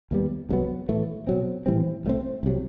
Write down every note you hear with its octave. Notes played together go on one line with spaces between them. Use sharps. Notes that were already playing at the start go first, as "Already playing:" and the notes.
D#2 D#3 G3 B3
C2 C3 F#3 B3
A2 E3 A3
B2 F#3 C4
A2 E3 G3 C4
C2 B2 A3 C4
C2 C3 F#3